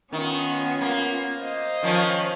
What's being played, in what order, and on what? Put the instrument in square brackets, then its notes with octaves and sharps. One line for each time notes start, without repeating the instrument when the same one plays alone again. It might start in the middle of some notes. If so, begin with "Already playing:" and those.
[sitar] D#3 [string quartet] B3 C#4 F4
[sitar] A#3
[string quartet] C5 D#5 F5
[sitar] D#3 F3 C#4